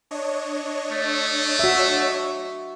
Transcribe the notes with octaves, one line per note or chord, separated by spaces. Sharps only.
D4 C#5 D#5
A3
F#4 E5